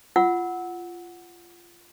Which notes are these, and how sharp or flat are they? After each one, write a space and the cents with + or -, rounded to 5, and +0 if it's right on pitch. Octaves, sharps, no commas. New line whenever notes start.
F4 -15 F#5 +0 E6 -20